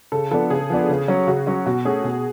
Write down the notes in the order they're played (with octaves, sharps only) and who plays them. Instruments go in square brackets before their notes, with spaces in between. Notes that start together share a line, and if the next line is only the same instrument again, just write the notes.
[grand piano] C#3 [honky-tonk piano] A4
[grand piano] F3 B3 D4 [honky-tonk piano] A4
[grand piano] C#3 [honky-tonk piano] G#4
[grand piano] F3 B3 D4
C#3
F#3 C#4
[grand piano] C#3 [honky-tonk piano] F#4
[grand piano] F#3 C#4
[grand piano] B2 [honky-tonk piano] F#4
[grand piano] A3 C#4 [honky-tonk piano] G#4
[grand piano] B2